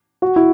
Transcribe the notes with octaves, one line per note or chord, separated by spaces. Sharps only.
F#4
E4